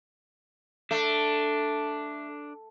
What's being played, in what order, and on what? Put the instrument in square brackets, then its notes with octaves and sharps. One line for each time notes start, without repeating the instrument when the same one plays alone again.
[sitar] A3 [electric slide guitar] D4